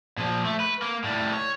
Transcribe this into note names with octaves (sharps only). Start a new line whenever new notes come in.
A#2 F3
A3
B4
A#3
A2 G3
C#5